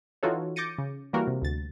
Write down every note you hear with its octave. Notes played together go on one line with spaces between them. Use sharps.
E3 D#4 F4 F#4 A4 C#5
D6 G6 A6 A#6 C#7 D#7
C#3
E3 G3 A#3 F#4 A#4
C3
D2 A6